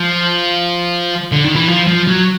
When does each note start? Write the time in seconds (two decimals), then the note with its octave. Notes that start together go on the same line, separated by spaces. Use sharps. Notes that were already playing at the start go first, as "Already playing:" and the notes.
Already playing: F3
1.32 D3
1.44 D#3
1.55 E3
1.68 F3
1.87 F3
2.08 F#3